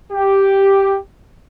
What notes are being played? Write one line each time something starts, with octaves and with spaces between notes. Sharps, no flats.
G4